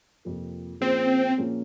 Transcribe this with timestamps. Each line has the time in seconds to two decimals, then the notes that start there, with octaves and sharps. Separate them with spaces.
0.25 F2 C3 F3 A#3
0.81 A#2 F3 A#3 C4 C#4 G#4
1.38 A#2 F3 A#3 C#4 G#4